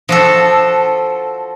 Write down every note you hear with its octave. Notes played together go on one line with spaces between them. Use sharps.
F3 F#4 A4